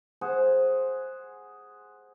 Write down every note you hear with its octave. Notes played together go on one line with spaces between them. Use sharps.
G#4 C5 F#5